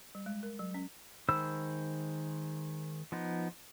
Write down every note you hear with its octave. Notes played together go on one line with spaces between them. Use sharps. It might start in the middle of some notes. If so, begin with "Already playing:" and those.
G3
G#3
A#4
F#3
C#4
D#3 G#3 C5 B5 E6
F3 B3 D#4